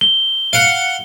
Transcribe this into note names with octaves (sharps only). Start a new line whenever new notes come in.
G7
F5 F#5